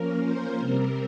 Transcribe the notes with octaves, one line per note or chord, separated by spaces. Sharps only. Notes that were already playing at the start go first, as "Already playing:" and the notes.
Already playing: F3 A#3 C#4 A#4
C5
C3 G3 C4 A#4